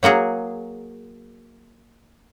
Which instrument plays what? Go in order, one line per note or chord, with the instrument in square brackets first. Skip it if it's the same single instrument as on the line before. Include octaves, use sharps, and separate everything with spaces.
[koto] F#3 A#3 F#4 G#4